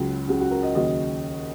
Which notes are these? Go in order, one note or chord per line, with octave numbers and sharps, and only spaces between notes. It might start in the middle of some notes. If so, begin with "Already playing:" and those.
Already playing: C#2 C#3 F#3
C#2 C#3 F#3 F#4
F#4
A#4
D#5
D#2 C#3 F#3 D#5